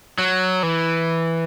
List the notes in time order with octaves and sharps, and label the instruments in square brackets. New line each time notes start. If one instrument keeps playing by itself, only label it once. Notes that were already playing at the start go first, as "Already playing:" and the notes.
[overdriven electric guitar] F#3
E3